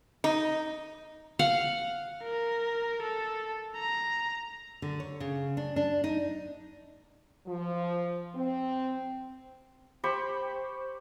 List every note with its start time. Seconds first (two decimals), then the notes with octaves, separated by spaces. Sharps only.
0.24 D#4
1.39 F5 F#5
2.23 A#4
3.02 A4
3.76 A#5
4.82 D3
5.00 C#5
5.20 C#3
5.57 D4
5.76 D4
6.04 D#4
7.47 F3
8.35 C4
10.04 G4 C5 B5 C#6